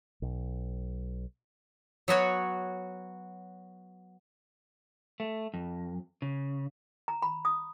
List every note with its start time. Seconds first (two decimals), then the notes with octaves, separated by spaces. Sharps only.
0.22 B1
2.08 F#3 B3 F#4 C#5
5.20 A3
5.54 F2
6.22 C#3
7.08 A#5
7.22 B5
7.45 D#6